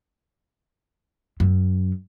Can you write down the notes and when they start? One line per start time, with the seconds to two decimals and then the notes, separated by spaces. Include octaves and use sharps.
1.40 F#2